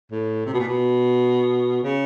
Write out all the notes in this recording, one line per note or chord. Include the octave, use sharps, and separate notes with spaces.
A2
C3
B2
A#2
B2
C#3